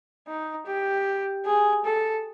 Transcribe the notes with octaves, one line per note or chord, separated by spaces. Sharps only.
D#4
G4
G#4
A4